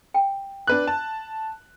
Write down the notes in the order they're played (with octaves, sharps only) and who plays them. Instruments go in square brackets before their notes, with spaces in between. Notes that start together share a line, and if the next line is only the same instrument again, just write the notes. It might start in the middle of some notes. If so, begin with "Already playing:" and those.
[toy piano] G5
[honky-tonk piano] D4 B4 F#6
A5